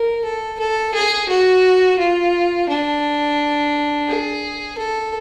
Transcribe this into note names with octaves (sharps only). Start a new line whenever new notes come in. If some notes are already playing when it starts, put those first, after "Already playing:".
Already playing: A#4
A4
A4
G#4
F#4
F4
D4
G#4
A4